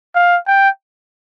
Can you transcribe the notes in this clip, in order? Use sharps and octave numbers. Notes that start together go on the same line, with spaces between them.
F5
G5